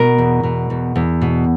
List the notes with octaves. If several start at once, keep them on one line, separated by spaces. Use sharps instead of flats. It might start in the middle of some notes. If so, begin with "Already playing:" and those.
Already playing: B2 A#4
E2
B2
E2
E2
B2